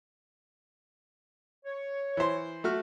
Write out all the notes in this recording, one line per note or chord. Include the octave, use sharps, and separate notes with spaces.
C#5
E3 C5
A3 F#4 F6